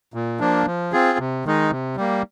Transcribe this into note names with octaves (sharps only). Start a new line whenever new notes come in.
A#2
F3 A#3 D4
F3
C4 F4 G#4
C3
D#3 G#3 D#4
C3
G3 A#3